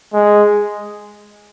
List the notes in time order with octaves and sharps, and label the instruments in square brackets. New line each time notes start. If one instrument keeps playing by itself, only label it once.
[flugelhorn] G#3